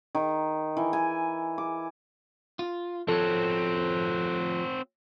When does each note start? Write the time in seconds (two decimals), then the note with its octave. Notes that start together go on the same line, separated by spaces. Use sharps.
0.15 D#3
0.77 E3
0.93 G#5
1.58 D6
2.59 F4
3.08 F3 C4 F#4 A4 C#5